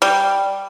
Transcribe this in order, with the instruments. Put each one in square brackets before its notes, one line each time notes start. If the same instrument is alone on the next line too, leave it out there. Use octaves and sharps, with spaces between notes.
[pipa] G3